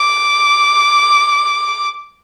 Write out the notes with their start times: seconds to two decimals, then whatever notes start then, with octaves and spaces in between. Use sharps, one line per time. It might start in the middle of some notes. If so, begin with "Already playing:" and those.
Already playing: D6